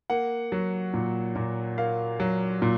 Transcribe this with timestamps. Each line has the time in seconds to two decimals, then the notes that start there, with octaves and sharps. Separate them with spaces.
0.10 A#3 F#5
0.52 F#3
0.94 A#2
1.36 A#2
1.78 A#3 F5
2.20 F#3
2.62 A#2